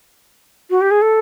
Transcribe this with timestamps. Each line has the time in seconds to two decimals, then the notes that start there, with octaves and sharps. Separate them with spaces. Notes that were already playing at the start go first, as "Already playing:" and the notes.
0.70 F#4
0.81 G4
0.91 G#4
1.02 A4